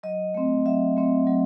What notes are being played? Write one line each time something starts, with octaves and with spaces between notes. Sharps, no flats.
F#3 D#5
A3 C4
F#3 E5
A3 C4
F#3